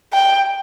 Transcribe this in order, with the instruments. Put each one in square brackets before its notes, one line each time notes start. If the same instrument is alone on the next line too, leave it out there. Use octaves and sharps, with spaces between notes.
[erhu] G5